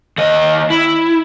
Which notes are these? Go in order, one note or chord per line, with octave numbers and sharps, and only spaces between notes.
D#2 D#5
E4